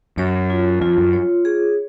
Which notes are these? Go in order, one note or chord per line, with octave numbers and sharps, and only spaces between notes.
F#2 C#5
F4
F2 F4
F#2
C#5
G#4